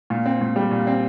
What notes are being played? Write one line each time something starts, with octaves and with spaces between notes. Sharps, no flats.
A#2
C4
A#2
G3
A#2
C4